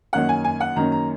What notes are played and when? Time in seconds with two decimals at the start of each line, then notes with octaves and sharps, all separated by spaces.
0.13 F#2 D#3 A#3 C#4 F#5
0.29 G#5
0.45 G#5
0.60 F#5
0.76 F#2 D#3 A#3 C#4 A#5
0.92 A#5